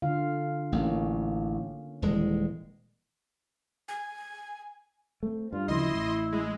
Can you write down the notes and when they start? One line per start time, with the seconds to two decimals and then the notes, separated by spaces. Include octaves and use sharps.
0.02 D3 F4 F5
0.72 A1 A#3 C#4
2.02 D#1 E3 G#3
3.88 G#5
5.23 A3 C4
5.53 G2 F4
5.68 D2 C#3 F3 E4 D#5 C6
5.93 A1 A2
6.32 G#3